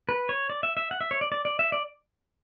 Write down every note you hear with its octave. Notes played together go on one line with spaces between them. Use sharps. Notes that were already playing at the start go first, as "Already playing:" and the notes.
B4
C#5
D5
E5
E5
F#5
E5
C#5
D5
D5
D5
E5
D5